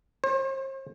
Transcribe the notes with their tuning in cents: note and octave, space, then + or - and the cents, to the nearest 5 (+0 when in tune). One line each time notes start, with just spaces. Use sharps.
C5 +40